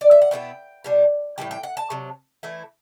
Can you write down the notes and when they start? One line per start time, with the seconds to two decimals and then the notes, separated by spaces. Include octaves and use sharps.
0.01 D5
0.11 E5
0.22 F#5
0.31 B2 G3 B3 E4 G5
0.84 B2 G3 D4
1.38 A2 E3 G3 G5
1.51 G5
1.63 F#5
1.77 A5
1.90 C3 F#3
2.43 E3 A3 E4